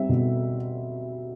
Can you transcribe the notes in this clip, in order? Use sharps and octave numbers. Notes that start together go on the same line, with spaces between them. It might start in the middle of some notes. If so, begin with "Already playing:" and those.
Already playing: G3 C4 E5
B2